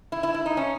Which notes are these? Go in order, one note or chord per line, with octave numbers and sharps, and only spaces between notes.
E4
E4
E4
D#4
C#4